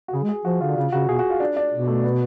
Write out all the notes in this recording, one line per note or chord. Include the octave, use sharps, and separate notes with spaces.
F#4
C#3 G#4
G#3
G#4
F3 F#4
D3 F4
D4
C#3 F4
C#3 F#4
B2 G#4
F#4
F4
D4
D4
B2
A3
B3